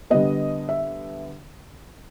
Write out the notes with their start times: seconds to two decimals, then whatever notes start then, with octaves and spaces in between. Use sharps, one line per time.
0.10 D3 G3 B3 D#5
0.69 E5